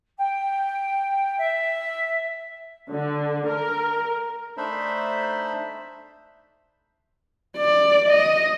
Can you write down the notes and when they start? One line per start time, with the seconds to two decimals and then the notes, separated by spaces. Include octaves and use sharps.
0.18 G5
1.38 E5
2.90 D3
3.48 A#4
4.57 A3 D4 D#4 C5 E5 B5
7.57 D5
8.09 D#5